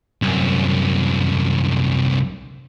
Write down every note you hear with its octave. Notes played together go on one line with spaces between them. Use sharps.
C2 F#2